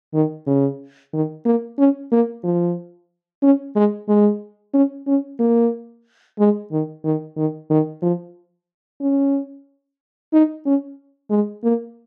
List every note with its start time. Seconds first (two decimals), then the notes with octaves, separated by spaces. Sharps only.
0.14 D#3
0.47 C#3
1.13 D#3
1.45 A#3
1.78 C#4
2.12 A#3
2.44 F3
3.43 C#4
3.76 G#3
4.08 G#3
4.74 C#4
5.07 C#4
5.39 A#3
6.39 G#3
6.71 D#3
7.05 D#3
7.37 D#3
7.70 D#3
8.02 F3
9.01 C#4
10.33 D#4
10.66 C#4
11.30 G#3
11.64 A#3